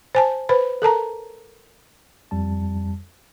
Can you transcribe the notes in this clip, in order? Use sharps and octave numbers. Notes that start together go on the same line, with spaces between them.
C5 G#5 A5
B4 C5 B5
A4 A#4 A5 A#5
F2 G3 A5